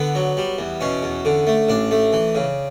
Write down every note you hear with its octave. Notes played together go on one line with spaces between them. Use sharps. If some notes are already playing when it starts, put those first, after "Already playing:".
Already playing: D3 B3
F#3
G3
E2
B2 C#4
E2
D3
A3
A1 D4
A3
E3
C#3